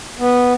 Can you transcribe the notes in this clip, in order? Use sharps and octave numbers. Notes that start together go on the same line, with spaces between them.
B3